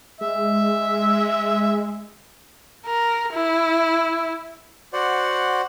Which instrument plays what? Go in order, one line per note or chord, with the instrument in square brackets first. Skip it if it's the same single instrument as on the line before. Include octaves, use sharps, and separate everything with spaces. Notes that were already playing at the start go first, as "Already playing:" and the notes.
[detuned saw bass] G#3 [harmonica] E5
[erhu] A#4
E4
[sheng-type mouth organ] F#4 C5 D5 F#5